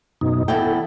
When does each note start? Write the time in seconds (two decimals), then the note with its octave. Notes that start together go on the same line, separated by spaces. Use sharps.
0.21 F#2 B2 D#4
0.48 E2 E4 A4 G5